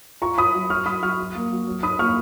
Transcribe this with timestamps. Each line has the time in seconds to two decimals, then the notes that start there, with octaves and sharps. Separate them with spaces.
0.22 F4 A#5 C#6
0.38 F4 B5 D#6
0.54 F#3
0.70 F#3 C#6 F6
0.86 F#3 B5 D#6
1.02 F#3 C#6 F6
1.18 F#3
1.35 A#3
1.51 F#3
1.67 F#3
1.83 D#4 B5 D#6
1.99 A#3 C#6 F6